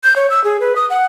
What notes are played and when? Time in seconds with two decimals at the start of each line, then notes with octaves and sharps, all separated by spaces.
0.04 G6
0.16 C#5
0.30 E6
0.44 G#4
0.60 B4
0.76 D#6
0.90 F#5